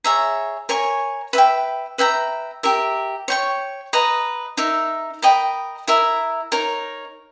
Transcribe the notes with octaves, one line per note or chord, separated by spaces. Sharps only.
G#4 C#5 E5 A#5
A#4 C#5 G#5 C#6
B4 E5 G5
B4 E5 G5 A#5
G4 A#4 E5
C#5 G5 C#6
B4 D#5 A#5
D#4 A#4 E5
A#4 D#5 G5 B5
E4 A#4 E5
D#4 A#4 C#5